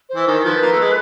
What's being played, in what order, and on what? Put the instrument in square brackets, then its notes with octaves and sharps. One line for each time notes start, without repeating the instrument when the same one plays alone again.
[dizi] C5
[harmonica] E3
[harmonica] D#3 [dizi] A#4
[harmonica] F3 [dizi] B4
[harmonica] A#3
A3
G#3